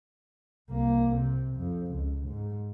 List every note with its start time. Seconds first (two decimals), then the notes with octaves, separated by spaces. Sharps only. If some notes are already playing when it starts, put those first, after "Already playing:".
0.70 C2 A#3
1.16 C3
1.56 F2
1.92 C#2
2.28 G#2